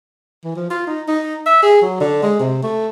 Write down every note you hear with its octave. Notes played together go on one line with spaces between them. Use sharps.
E3
F3
F4
D#4
D#4
E5
G#4
F#3
D3
G#3
C3
A3